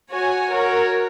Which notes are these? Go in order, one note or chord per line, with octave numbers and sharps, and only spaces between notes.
F#4 C#5 G#5
F#4 A#4 C#5